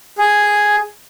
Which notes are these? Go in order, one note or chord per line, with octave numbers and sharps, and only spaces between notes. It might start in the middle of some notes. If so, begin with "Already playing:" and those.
G#4